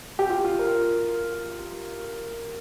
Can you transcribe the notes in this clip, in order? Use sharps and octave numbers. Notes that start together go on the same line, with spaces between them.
G4
F4
F4
A#4